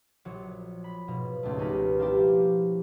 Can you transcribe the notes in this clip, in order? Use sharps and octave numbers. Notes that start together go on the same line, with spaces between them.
A#1 F#3 C#7
B5
G#2 B2 F3 A#3
C#2 G#2 A3
C#4 D#4 G4 A#4 B4
F3 G3 A#3 D4 E4 G4